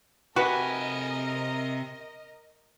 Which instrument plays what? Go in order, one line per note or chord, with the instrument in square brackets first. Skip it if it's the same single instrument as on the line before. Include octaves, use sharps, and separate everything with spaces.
[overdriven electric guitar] C3 G#5 [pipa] F#4 G4 B4 [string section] A#4 D#5